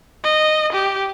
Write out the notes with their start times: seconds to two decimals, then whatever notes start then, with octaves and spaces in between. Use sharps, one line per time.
0.24 D#5
0.72 G4